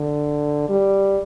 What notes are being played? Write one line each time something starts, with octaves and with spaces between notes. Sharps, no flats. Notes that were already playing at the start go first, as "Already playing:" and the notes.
Already playing: D3
G3